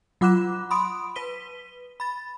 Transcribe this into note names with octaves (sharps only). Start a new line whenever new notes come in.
F#3 F4 F#5 D6 F#6 E7
B5 C6 D#6 D7
B4 B6 D#7 G7
B5 A6